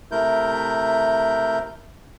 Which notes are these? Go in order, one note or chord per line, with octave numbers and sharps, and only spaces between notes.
C3 A3 E4 A#4 G6